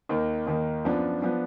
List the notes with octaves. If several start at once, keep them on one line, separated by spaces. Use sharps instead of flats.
D#2 D#3 A#3
D#2 D#3 A#3
F#2 F3 B3 D4
F3 B3 D4